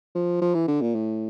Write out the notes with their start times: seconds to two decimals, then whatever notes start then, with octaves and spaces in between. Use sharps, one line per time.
0.15 F3
0.41 F3
0.54 E3
0.68 D3
0.81 A#2
0.95 A2